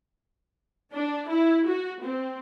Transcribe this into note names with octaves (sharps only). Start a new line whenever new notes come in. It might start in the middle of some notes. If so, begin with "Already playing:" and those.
D4
E4
F#4
C4